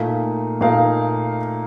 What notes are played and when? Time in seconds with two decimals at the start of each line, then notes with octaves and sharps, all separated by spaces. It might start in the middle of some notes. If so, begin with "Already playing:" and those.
Already playing: A#2 A3 D#4 A#4 F5
0.61 A#2 A3 D#4 A#4 F5